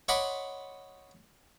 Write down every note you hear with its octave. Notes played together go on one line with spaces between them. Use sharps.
C#5 D#5 F#5 B5 C6 D6